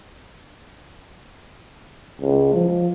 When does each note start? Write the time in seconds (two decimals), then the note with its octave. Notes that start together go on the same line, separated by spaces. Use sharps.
2.21 C#2
2.54 F3